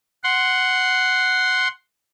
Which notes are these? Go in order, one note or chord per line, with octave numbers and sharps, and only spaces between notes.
F#5 C6